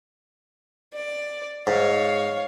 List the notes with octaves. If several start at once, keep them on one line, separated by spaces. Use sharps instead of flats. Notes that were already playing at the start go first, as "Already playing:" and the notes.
D5
G#2 C#5 F5